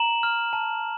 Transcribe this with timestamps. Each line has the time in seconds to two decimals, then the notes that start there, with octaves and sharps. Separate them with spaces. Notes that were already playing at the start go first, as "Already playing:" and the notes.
Already playing: A#5 E7 F#7
0.23 F6
0.53 A5